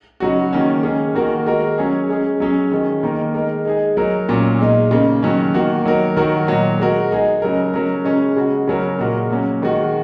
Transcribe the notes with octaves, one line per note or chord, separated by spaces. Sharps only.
C#3 F#3 D#4 F#4
D#3 A#3 C#4
G#3 C#4 G#4
D#3 A#3 F#4 A#4
G#3 F#4 A#4
F#3 C#4 G#4
G#3 C#4 G#4
F#3 C#4 G#4
D#3 G#3 C#4
D#3 A#3 D#4 A#4
G#3 D#4 A#4
G#3 D#4 G#4
F#3 D#4 A#4
A#2 F#3 A#3 C#4
A#2 G#3 D#4
C#3 A#3 D#4
D#3 F#3 C#4
D#3 A#3 F#4
F#3 D#4 A#4
D#3 F#3 D#4 F#4 A#4
A#2 F#3 D#4
G#3 F#4 A#4
G#3 D#4 G#4
C#3 F#3 D#4 A#4
F#3 C#4 A#4
C#3 G#3 C#4
C#3 G#3 F#4
C#3 F#3 C#4 A#4
A#2 G#3 F#4 A#4
F#3 A#3 C#4
D#3 G#3 D#4 F#4